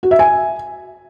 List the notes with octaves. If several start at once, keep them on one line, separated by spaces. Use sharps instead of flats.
F#4
E5
G#5